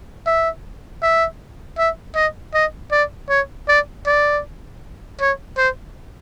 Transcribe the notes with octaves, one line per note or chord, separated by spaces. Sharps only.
E5
E5
E5
D#5
D#5
D5
C#5
D5
D5
C#5
C5